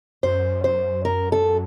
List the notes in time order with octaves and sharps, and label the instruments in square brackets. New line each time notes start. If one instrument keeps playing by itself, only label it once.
[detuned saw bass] F#2 [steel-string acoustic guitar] C5
[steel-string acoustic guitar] C5
A#4
A4